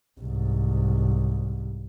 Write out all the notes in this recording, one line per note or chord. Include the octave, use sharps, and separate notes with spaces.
C2 G#2